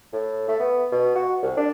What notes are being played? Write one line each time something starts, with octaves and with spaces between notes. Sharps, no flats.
A2
A3
B3
B2
F#4
C2
D4